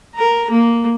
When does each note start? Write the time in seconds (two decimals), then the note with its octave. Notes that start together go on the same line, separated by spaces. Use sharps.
0.15 A#4 A#5
0.50 A#3